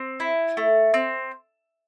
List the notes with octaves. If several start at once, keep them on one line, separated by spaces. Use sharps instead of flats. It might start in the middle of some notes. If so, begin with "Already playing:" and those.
Already playing: C4
E4
A3
C4